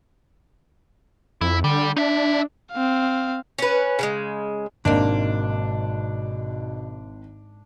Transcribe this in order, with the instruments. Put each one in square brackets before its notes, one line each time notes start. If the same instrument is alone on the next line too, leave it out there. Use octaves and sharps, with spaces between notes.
[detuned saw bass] F2 [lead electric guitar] E4
[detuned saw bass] D3 [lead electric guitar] G3
[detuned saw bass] D4 [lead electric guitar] D#4 E5
[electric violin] C4 F5
[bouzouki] C#4 B4
C#3 E3 G#3
[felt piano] G#1 [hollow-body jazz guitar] G#2 A#3 [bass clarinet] B2 [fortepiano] D4